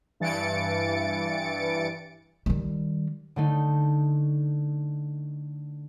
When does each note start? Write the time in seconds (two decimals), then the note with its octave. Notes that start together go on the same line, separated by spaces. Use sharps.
0.20 G2 E3 A6 C#7 D7
2.46 D#3 G3
3.36 D3 A3 D#4